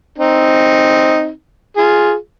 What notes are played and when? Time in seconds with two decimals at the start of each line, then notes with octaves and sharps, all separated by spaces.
0.18 C4 D#4
1.77 F4 G#4